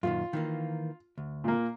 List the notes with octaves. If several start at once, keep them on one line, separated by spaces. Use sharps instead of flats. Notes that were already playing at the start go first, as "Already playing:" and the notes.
F#2 A#2 D#3 F4
D#3 E3 A#3
D2
A#2 A#3